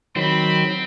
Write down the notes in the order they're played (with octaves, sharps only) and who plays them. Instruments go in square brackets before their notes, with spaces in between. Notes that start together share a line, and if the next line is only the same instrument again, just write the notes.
[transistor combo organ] D#3 F#3 [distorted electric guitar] C4 [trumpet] B5